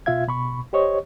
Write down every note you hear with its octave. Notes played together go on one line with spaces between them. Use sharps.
B2 F4 E5 F5 G#6
B2 B5 C#6
G4 C5 C#5 D#5 C#6